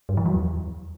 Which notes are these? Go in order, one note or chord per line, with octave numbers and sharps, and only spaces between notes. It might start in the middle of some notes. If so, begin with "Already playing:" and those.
G2
E3
F#3
E2